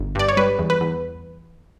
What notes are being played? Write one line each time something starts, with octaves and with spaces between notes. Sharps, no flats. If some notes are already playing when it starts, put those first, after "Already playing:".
Already playing: G1
G2 D5
C#5
G3 B4
E2
B4
E2